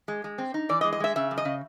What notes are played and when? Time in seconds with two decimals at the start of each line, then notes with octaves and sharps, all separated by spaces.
0.08 G#3
0.24 G#3
0.38 C4
0.54 D#4
0.69 E3 D5
0.81 D#5
0.84 G#3
0.93 D#5
1.00 G#3 E5
1.16 C#3 E5
1.31 F#2
1.38 D#5
1.45 C#3